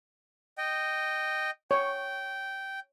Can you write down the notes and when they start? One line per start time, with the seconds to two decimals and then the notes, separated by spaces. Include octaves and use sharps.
0.58 D#5 G5
1.71 C#5 G5